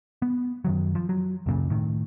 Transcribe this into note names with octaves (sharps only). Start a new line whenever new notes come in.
B3
F#2 D#3 F#3
F3
F#3
C#2 F#2 A#2 C#3
A2 D#3